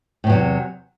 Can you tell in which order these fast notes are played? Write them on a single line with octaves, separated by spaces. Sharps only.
A2 E2 F#3 C3